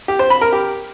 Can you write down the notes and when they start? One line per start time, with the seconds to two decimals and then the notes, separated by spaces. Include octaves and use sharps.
0.08 G4
0.19 C5
0.30 B5
0.41 A#4
0.52 G4